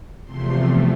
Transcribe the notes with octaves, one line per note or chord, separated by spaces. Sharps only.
E2 C3 F3 A3 C6